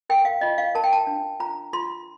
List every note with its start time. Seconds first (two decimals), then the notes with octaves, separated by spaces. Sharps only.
0.09 A#4 G5
0.25 F5
0.41 F4 D#5
0.58 F5
0.75 A#4 A5
0.84 G5
0.93 A5
1.07 D4
1.40 F4 A#5
1.73 F4 C6